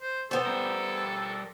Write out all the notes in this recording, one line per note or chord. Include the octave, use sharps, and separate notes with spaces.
C5
B3 A4 C5
G3 A#4